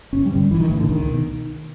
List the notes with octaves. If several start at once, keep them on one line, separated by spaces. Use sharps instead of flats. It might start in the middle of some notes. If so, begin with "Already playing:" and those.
G1 C#4
G3
G2 D3
A#1 E3
D#3
A2 E3
D3
C#2 D#3
B2